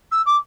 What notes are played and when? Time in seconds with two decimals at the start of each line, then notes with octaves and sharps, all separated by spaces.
0.11 E6
0.25 D6